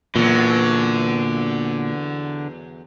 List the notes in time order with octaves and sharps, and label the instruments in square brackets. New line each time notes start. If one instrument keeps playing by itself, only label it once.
[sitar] E2 F#3 [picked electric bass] A#2 [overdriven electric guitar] D3